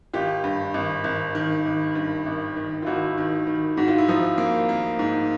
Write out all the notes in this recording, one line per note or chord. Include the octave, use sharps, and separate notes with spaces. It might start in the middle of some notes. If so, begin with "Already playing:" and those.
G#1 F4 G4
G2
G#1
G#1
D#3
G#1
G2
G#1
D#3
F4
G#1 E4 F#4
D#3
D#3
G#2 F#4
F4
E4
F3 D#4 F4
A#3
A#3
G#2